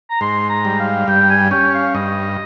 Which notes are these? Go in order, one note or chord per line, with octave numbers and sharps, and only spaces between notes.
A#5
G#2 C6
A#5
G3
F5
G2 G5
G#5
C#4 G5
F5
G2 D#5